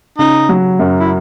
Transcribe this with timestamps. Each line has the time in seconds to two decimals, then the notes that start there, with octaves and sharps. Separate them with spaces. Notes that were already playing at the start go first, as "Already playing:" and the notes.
0.18 C#3 D#4
0.49 F#3
0.79 F#2
1.00 E4